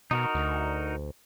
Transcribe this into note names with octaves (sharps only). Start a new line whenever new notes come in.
B2 D#4 F#4 A#4
D2